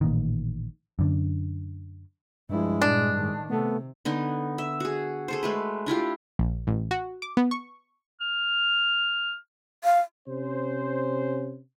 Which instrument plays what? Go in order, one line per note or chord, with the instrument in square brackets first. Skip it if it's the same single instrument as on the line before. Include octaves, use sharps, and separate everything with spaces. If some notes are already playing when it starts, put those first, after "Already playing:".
[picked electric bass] A1 A#2 D#3
F#2 D3
[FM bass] G2 [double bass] F3 E4 [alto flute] G#3
[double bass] A#2 [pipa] D4
[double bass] A2 D#3
[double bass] C3 [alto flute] A3 [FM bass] B3
[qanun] D3 B3 D#4
E5
F#4 G#4
G#4 A4 C5
G#3 A3 B4
D4 E4 F4 G4
[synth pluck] A#1
A1
F#4
D6
B3
C#6
[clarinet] F6
[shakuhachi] F5
[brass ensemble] C3 C#4 C5